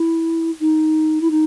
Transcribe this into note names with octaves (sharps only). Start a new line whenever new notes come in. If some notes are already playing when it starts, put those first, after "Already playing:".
Already playing: E4
D#4
E4
D#4